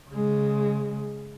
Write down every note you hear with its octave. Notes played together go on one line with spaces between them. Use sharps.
C#3 G#3